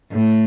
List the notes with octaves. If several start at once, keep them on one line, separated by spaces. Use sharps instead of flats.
A2